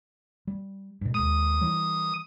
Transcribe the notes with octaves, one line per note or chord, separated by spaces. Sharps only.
G3
G2 B2
D#2 G#3 D#6
E3 G3